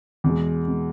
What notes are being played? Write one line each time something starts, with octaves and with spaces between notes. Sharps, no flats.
E2 B2 G#3
B2 G#3